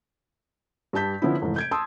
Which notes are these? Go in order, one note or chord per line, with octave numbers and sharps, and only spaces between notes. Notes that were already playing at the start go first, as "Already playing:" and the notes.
G2 G3 A5 G6 B6
D3 F3 B3 C#4 E4
F1 G#2 E3
G6 G#6 D7
A5 C6 D#6 E6